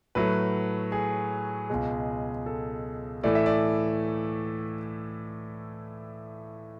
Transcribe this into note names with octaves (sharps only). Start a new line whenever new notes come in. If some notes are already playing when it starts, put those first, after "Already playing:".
A2 F#3 A3 B4
G#4
C#2 B2 G#3
A4
A2 E3 A3 D5
E5
D5